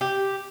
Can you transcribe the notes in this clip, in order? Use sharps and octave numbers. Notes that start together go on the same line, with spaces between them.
G4